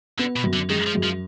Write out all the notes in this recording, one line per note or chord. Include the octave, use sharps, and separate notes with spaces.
D3 B3
B2
F#2
D3
D#3 G#3
F3
F#2
F3